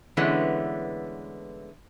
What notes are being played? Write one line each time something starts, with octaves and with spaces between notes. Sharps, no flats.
D3 E3 G#3 A3 B3 C#4